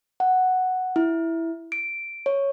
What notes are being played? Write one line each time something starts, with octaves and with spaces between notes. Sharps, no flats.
F#5
E4
D7
C#5